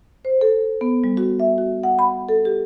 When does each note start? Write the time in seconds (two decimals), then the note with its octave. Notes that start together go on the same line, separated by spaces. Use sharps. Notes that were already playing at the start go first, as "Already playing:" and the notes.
0.25 C5
0.41 A4
0.81 B3
1.04 G3
1.17 F#4
1.40 E5
1.58 F#4
1.83 F#5
1.99 B5
2.29 A4
2.45 G4